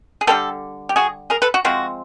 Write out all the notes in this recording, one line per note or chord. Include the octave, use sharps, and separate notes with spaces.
G#4
D3 G3 B3 G4 A4
G4
F#4 G#4
G#4 A#4
A4 B4
F#4
F3 G#3 C4 F#4